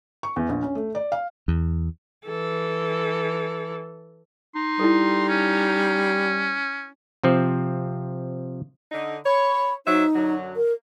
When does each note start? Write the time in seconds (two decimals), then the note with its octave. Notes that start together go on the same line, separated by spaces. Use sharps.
0.23 C#6
0.36 E2
0.49 A#1
0.63 C#4
0.75 A3
0.95 D5
1.12 F5
1.48 E2
2.26 E3 A4
4.55 D#4 C6
4.80 G3 E4 A4
5.29 C#4
7.23 C3 F3 C4
8.92 D3 D#4
9.26 C#5 B5
9.87 F#3 D#4 C5 E5
10.15 F#2 D3 F#3
10.56 A#4